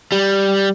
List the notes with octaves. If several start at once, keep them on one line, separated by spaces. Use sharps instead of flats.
G3